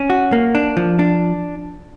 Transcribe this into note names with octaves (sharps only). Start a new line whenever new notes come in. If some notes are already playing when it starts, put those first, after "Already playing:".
Already playing: C#4
F#4
A#3
D4
F3
D4